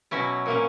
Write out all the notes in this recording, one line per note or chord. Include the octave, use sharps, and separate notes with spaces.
B2 F#3 C#4 E4
A#2 A#3 C#4